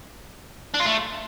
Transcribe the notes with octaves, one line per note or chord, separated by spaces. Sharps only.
D4
F4
A3